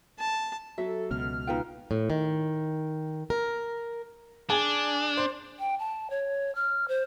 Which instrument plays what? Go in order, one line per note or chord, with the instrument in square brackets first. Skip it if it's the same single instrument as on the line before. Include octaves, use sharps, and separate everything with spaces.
[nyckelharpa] A5
[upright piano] F#3 [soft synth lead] A4 [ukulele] E5
[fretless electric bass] C#2 B2 [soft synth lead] F6
[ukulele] D#4 B4 G5 [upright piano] F4
[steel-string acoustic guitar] A2
D#3
A#4
[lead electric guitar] D4 [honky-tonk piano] G#4
[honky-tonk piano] C5
[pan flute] G5
A5
C#5
F6
C5